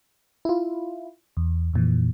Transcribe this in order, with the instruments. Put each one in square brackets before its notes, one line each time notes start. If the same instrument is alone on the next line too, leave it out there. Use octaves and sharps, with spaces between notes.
[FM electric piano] E4 F4
E2
F2 A#2 E3